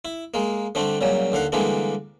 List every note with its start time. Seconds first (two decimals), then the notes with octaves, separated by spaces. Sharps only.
0.05 E4
0.34 G#3 A#3
0.75 D3 G3 A3 C4 D4
1.01 A#2 C#3 F#3 G3
1.32 D#2 D3 F5 F#5
1.52 D3 E3 G3 G#3 A#3 D4